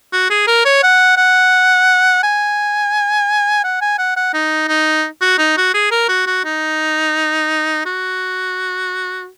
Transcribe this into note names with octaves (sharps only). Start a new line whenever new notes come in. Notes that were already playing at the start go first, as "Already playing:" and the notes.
F#4
G#4
A#4
C#5
F#5
F#5
G#5
F#5
G#5
F#5
F#5
D#4
D#4
F#4
D#4
F#4
G#4
A#4
F#4
F#4
D#4
F#4